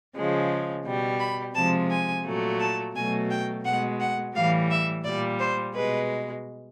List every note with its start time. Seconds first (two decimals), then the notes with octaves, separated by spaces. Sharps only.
0.15 C#3 F3 G#3
0.85 B2 G3
1.20 B5
1.55 C3 F3 G#3 A5
1.90 G#5
2.25 A#2 F#3 A3
2.60 A5
2.94 B2 F#3 A3 G#5
3.30 G5
3.65 B2 G#3 F#5
4.00 F#5
4.35 A2 E3 G3 F5
4.70 E5
5.04 A#2 G3 D5
5.39 C5
5.74 B2 G#3 B4